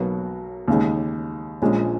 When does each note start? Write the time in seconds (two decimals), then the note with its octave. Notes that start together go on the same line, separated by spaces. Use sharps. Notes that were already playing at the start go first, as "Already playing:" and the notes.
Already playing: B1 B2 F#3 A#3
0.68 D#2 C#3 G#3 D#4
1.62 A#1 A#2 G#3 C#4